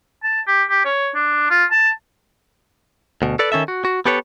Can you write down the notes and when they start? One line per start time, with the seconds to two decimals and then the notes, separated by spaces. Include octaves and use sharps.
0.23 A5
0.47 G4
0.69 G4
0.85 C#5
1.15 D4
1.50 F4
1.71 A5
3.22 D2 B2
3.39 A4 B4 D5
3.52 D#3 C#4 A4 E5
3.68 F#4
3.85 F#4
4.05 B3 G4 A4 B4 C#5